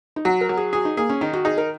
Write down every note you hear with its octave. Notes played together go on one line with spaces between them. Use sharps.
D#4
F#3 F#4
A#4
F#3
G#4
F#4 G#4
D#4
A#3 G#4
C#4
D#3 D#4
F#4
D#4 G#4
A#4